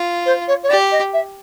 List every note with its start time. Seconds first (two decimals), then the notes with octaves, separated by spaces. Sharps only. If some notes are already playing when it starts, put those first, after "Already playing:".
Already playing: F4
0.26 C5
0.48 C#5
0.63 C#5
0.69 G4 D5
0.92 D#5
1.13 E5